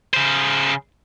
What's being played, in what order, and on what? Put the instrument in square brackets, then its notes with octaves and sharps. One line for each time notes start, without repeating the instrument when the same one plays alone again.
[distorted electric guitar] C#3 C5